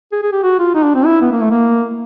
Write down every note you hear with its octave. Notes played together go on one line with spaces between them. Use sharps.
G#4
G#4
G4
F#4
F4
D#4
D4
C4
E4
B3
A#3
A3
A#3